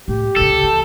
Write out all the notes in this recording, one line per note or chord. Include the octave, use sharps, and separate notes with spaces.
A2 G4
A#2 C#3 A4
E3